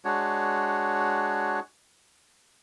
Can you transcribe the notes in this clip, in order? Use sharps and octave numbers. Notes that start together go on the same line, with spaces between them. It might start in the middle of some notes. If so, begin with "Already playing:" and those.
G#3 D4 F#4 C#5